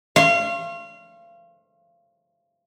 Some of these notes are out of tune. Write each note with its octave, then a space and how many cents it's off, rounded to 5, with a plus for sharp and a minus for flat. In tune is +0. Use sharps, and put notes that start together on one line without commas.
F5 -30 C6 +45